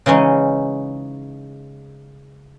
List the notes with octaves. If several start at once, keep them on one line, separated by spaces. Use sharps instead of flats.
C#3 E3 G#3 C#4 D#4